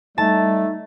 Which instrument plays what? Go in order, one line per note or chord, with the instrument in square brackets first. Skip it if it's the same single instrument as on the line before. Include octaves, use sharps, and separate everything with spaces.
[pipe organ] G3 [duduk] A3 [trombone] D#4 [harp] A5